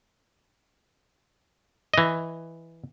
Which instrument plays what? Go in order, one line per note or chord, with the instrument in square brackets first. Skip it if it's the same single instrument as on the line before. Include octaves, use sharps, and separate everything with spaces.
[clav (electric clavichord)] E3 D#5